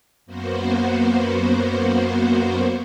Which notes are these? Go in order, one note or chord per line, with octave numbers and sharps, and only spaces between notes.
F#2 A#3 B3 F#4 C5